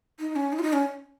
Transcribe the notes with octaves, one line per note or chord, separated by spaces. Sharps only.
D#4
C#4
D#4
F4
D#4
C#4